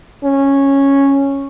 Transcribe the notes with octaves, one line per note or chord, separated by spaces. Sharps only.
C#4